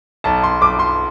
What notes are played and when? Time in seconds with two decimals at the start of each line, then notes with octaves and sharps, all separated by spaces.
0.24 B1 A5
0.43 C6
0.61 B1 D6
0.79 C6